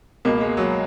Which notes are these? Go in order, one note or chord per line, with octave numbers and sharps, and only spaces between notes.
C#2 B2 A#3
G#3
F#3